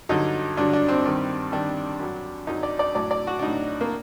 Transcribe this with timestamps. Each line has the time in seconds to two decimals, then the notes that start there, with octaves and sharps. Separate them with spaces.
0.09 G2 D3 F#3 D#4
0.57 G2 D3 F#3 D4
0.73 D4
0.88 C4
1.05 G2 D#3 G3
1.52 G2 D#3 G3 D4
2.00 F#2 F#3
2.47 F#2 F#3 D#4
2.63 D5
2.79 D5
2.95 A2 F#3 D5
3.11 D5
3.27 F#4
3.39 D4
3.42 A2 F#3 D#4
3.81 A#3